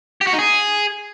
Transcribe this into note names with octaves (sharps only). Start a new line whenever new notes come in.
G4
F#4
D#4
G#4